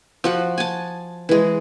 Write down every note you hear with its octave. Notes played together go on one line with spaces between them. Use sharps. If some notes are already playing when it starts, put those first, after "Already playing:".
F3 F#4 F#5
G#5 A5
E3 G#3